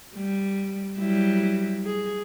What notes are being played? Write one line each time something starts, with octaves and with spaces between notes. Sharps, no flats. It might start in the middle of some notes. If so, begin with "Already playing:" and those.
G3
F#3 G3 E4
G#4